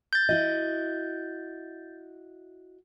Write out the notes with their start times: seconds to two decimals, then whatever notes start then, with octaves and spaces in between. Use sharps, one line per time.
0.13 G6 A6
0.29 E4 F#4 D#5